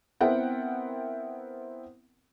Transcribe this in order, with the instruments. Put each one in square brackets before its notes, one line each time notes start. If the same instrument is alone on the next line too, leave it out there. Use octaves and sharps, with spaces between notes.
[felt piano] B3 C4 E4 A#4 F#5 G5